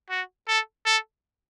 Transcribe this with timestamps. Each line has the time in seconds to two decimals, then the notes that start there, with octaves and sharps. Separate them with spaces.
0.10 F#4
0.48 A4
0.86 A4